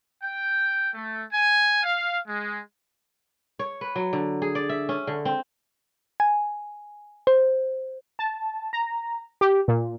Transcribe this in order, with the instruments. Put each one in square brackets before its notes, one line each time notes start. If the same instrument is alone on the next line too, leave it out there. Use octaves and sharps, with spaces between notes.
[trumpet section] G5
A3
G#5
F5
G#3
[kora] C#5
B4
F#3
D3
G#4
D5
E5
C#4
D3
C4
[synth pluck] G#5
C5
[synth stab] A5
A#5
G4
A#2